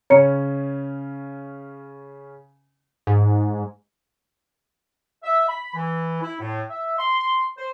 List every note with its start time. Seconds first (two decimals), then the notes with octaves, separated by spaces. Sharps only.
0.10 C#3 C#4 C#5 A#5 C#7
3.07 G#2
5.23 E5
5.48 B5
5.74 E3
6.22 E4
6.39 A2
6.69 E5
6.99 C6
7.57 C5